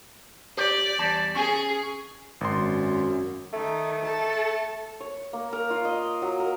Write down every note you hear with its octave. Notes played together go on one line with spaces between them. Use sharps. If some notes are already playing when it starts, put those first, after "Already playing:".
G4 D5
E2 G3 A5
C#4 G#4 G#5
G#1 F#2 C6
D#3 A3
A4 A5
C#5
A#3
A#4
F4
D#5
F#3
A#4